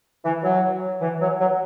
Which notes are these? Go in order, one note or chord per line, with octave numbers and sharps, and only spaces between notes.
E3
F#3
E3
F#3
F#3